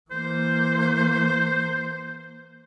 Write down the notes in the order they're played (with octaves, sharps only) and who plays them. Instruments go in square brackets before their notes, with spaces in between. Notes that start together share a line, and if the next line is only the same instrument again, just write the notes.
[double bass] E3 A#3 [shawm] C5